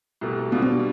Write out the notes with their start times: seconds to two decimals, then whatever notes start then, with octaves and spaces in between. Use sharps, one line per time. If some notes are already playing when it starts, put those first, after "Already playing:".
0.21 C2 B2 A3
0.52 B2 G3 B3 D4 F4
0.62 C4
0.72 B3